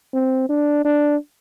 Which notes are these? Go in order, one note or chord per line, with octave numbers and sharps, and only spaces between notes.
C4
D4
D4